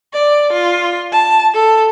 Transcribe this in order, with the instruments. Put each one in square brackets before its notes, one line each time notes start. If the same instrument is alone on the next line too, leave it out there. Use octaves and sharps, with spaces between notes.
[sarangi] D5
F4
A5
A4